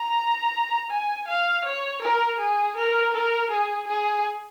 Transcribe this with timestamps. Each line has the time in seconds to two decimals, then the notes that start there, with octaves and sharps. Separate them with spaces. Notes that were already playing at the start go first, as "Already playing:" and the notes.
Already playing: A#5
0.90 G#5
1.27 F5
1.64 C#5
2.02 A#4
2.39 G#4
2.76 A#4
3.13 A#4
3.50 G#4
3.87 G#4